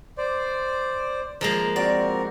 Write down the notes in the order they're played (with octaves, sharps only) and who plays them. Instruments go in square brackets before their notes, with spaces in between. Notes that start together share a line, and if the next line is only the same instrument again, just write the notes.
[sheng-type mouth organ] C5 D5
[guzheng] F3 G#3 A#3 [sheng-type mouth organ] A#4
[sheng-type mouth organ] C4 F#4 A#4 [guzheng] D5